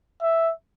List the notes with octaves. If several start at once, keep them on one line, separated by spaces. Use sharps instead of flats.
E5